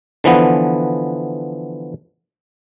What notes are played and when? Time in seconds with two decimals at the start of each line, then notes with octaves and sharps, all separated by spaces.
0.24 D3 E3 F3 B3